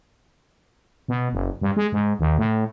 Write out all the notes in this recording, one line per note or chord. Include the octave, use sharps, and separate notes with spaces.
B2
F#1
G2
G#3
G#2
D#2
A2